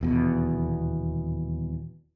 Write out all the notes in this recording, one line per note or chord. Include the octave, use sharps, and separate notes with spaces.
D#1 E2 B2